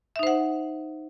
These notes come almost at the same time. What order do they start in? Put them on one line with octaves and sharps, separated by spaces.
E5 D#4 C5 F#5